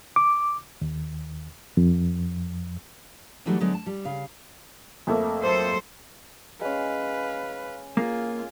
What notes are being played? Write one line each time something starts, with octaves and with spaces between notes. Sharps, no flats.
D6
D#2
F2
E3 F#3 G3 A3 D#4 F#4
D3 F#3 G#3 B3
A5
G3
C#3 F5
F2 A3 A#3
F#3 A4 C5
G#3 C#4 B4 F5
A#3 F4 G#4